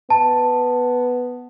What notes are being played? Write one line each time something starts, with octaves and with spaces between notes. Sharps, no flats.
B3 A5